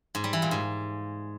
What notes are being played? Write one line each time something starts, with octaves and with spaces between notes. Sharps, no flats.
G#2
G3
E3
A#2
G#2